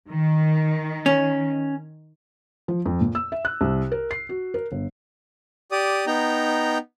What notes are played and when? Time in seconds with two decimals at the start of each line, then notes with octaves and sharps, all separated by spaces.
0.10 D#3
1.06 C#4
2.68 F3
2.85 F2
3.01 A#2
3.15 E6
3.32 E5
3.45 F#6
3.61 C2
3.92 A#4
4.11 C7
4.29 F#4
4.54 A#4
4.72 G1
5.72 G4 D5 D#6
6.07 B3 D#4 G5 A#5